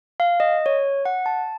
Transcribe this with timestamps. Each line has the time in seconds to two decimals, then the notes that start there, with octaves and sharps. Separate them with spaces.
0.20 F5
0.40 D#5
0.66 C#5
1.05 F#5
1.26 A5